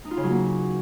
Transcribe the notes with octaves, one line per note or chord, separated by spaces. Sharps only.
D#4
F4
C#3
F#3
A#3